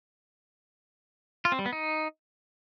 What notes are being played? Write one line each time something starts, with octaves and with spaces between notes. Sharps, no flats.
F4
C4
G3
B3
D#4